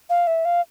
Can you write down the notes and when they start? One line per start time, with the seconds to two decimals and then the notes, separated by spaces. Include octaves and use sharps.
0.10 F5
0.27 E5
0.45 F5